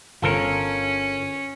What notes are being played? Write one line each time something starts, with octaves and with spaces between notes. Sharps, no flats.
G1 D3 C#4 F4 A4 A#4